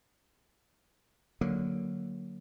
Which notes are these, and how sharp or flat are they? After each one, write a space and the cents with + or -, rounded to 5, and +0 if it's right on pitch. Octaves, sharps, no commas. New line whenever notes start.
D3 +0 F#3 +0 A#3 +0